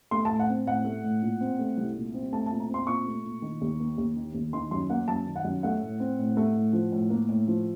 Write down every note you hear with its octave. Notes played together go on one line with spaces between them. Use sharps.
A3 C6
A5
A2
F#5
C4
A2 F#5
A3
A2
A#2
C4
A3
C2
A#2
C4
A3 A5
A#2 A5
A#5
C4
C6
A#2 C#6
A3
A#2
D#3
D#2
A#3
D#2
D#3
D#2
D#3 C6
F#2 C6
A#3 F#5
F#2 A5
D#3
F#5
F#2
A3 F#5
A2
C4
A2
A3
A2
F3
A2
A#3
A2
F3